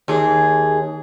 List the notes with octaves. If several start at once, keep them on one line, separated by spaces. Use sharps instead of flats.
D#2 G#4